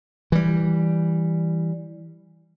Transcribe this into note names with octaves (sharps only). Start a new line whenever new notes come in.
E3 G3